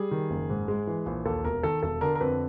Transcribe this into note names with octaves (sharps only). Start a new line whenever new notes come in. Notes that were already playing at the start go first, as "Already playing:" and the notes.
Already playing: G3 G#4
D#3
F#1
G#2
G#3
E3
A#1
D#2 A4
E1 A#4
D#3 A4
E1 A4
D3 A#4
A#4
F2 B4